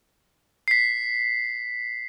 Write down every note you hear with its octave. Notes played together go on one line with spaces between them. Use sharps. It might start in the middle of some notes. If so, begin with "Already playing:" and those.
B6 C7